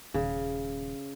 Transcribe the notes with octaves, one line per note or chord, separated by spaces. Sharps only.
D#1 C#3